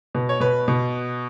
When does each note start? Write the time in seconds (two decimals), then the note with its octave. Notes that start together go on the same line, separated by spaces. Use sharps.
0.15 B2
0.29 C#5
0.40 B2 B4
0.68 B2